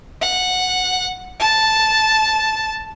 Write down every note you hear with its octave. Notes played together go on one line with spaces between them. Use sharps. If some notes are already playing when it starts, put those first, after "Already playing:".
F#5
A5